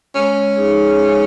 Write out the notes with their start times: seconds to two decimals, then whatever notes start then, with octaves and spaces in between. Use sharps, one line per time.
0.15 G#3 C#4
0.56 D#4 G#4
0.96 G#3